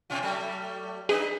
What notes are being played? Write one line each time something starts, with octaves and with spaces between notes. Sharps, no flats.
B2 C#4 F4
F#3 G3 A3
D4 D#4 G#4 B4